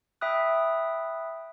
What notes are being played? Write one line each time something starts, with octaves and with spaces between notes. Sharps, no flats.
E5 G5 B5 D#6 F#6